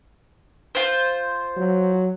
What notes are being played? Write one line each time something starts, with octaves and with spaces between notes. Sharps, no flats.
F4 C5
F#3